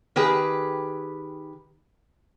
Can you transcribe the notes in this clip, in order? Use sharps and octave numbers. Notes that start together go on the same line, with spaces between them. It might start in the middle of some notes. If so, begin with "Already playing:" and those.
D#3 G4 G#4 B4